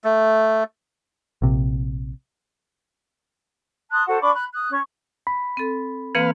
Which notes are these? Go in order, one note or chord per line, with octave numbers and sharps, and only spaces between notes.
A3
A#1 C3
A5 C6 D#6 F#6
F#4 A4 C5 F#5
D4 B5 C#6 D6
B5 F#6
D#6 F#6
C#4 C#6
B5
C4 A4
E3 A#3 C4 B4 F5